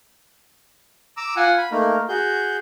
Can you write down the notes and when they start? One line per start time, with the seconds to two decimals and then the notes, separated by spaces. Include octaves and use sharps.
1.17 A#5 D6 E6
1.36 F4 F#5 G#5
1.58 B5
1.71 A3 A#3 D#4 A#4
2.09 F#4 G#4 G6